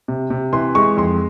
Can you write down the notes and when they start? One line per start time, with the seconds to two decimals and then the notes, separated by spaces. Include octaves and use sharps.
0.08 C3
0.30 C3
0.53 E3 C6
0.75 G#3 C#6
0.97 F2 C6